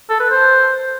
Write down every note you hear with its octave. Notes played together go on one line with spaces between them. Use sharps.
A4
B4
C5